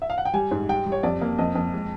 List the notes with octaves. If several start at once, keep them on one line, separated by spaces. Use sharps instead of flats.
E5
F5
F#5
G5
G3 G#5
G#2
G3 G5
G3
C#5
F2 D5
A#3
F2 D#5
F2
G#3